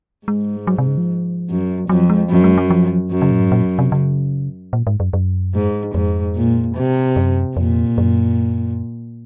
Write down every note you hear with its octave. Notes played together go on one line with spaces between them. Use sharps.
G#2 G#3
F#3
C3
C#3
F3
F#2
F2 F#3
G#3
F#2
G#3
F#3
F3
F#2
C#3
A#2
G#2
A#2
C3
C#3
A#2
G#2
F#2
F#2
G#2
F2 G#2
A#2
C3
F#2
F2 A#2
F#2